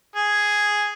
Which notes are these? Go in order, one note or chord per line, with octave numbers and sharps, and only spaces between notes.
G#4